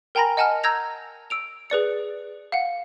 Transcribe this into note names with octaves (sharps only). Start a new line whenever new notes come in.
A#4 G5 G#5 A#5 B5 A#6
D#5 F#5 G#5 A5 F6
A#5 E6 G6 G#6 A#6 F7
E6 D7 F7
G#4 B4 D5 C#7
F5 F#5